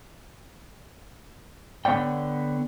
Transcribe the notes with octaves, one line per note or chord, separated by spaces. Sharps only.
D3 B3 C#5 D5 G5